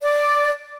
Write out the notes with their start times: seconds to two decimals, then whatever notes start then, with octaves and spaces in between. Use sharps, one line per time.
0.02 D5